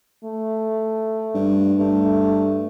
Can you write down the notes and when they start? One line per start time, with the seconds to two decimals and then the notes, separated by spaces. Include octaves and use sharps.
0.24 A3
1.34 G2
1.79 G2 A3